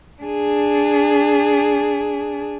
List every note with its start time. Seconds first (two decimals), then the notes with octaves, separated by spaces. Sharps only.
0.22 D4 G#4